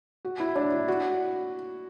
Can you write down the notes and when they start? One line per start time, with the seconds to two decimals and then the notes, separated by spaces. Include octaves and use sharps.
0.25 F#4
0.40 E4
0.56 D4
0.72 E4
0.88 F#4